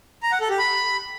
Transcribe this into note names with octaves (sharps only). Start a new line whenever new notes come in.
A#5
F#5
A4
G4
B5